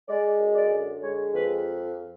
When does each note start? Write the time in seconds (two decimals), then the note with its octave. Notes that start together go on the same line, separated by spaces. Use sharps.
0.08 G#3 D5
0.39 F#2
0.55 D5
0.71 D3
1.02 G#3 C#5
1.33 F2 B4